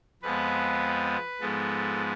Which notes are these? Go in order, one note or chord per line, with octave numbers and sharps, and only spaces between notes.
F2 F3 G#3 B3 B4
G#2 F3 G#3 B3 A4